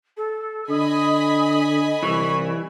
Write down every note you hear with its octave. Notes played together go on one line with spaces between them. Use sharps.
A4
D3 D#5 G#5 B5 D#6
C2 E3 C#6